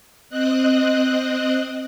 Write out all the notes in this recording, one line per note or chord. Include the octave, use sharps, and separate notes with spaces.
C4 D#5 F#6